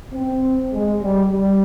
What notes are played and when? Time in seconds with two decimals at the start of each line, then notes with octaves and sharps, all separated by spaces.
0.13 C4
0.73 G#3
1.02 G3
1.32 G3